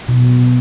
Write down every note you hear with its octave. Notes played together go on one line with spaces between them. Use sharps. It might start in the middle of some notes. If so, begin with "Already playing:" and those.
B2